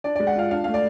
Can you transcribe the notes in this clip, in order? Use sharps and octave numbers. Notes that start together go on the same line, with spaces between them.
D4 D5
D5
G#3
F#5
F4 F5
D4 F5
A3 F5
D5